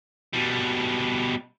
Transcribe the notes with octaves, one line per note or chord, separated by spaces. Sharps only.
B2 G3